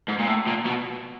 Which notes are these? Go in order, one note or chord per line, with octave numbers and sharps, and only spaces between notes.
G#2
A#2
A2
A#2
B2